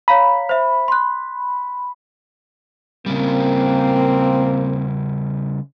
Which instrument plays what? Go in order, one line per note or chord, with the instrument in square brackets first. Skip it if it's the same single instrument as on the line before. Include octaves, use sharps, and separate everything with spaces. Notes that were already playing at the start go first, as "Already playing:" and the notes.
[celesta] C#5 F5 A#5 [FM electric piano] B5
[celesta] C5 E5
C6 F#6
[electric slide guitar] C#3 G3 [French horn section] A#3 C4